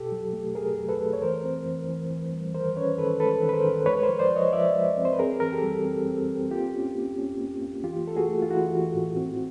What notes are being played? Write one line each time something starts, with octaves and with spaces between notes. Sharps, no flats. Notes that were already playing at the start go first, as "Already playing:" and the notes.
Already playing: B2 G4 A4
F#3
A3
A3 G#4 A#4
F#3
A4 B4
A3
C#5
E3 A#4 C5
C4
E3
E3
E3
G3
D#3 A#4 C5
C#4 B4 C#5
D#3 A4 B4
G#3 A4 B4
D#3
B4
A#4 C5
D#3
G#3 B4 C#5
A#4 C5
F3
C5 D5
F3
C#5 D#5
F3 D5 E5
G#3
C4
C5
B4
C4 G#4 A#4
E3 A#4
G4 A4
G3
C4
C4
C4
A#3 F4 G4
C#4
A#3
C#4
A#3
A#3
E3 F4 G4
A3 A4
F#4 G#4
A3
F4
E3 E4 F#4
E3
A2
C4